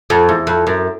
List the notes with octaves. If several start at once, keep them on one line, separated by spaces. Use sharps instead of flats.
F2
E2
F2
F#2